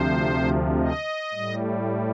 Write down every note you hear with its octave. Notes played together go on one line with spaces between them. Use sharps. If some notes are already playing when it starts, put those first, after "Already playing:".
Already playing: D2 C3 F3 C5
D#5
A2 G3